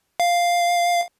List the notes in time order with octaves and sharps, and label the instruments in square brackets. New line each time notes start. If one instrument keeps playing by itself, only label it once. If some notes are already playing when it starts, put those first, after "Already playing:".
[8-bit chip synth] F5